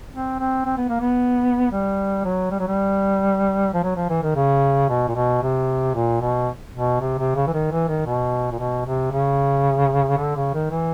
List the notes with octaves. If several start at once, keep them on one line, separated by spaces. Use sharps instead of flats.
C4
C4
C4
B3
A#3
B3
G3
F#3
G3
F#3
G3
F3
F#3
F3
E3
D#3
C#3
B2
A#2
B2
C3
A#2
B2
B2
C3
C3
C#3
E3
D#3
E3
D#3
B2
A#2
B2
C3
C#3
D3
C#3
D#3
E3